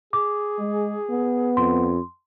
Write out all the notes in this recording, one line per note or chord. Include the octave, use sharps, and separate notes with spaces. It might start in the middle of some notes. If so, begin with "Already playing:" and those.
G#4 D6
G#3
B3
F2 C6